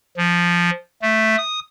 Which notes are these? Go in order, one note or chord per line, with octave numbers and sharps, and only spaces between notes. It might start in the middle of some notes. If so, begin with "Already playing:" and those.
F3
A3
D#6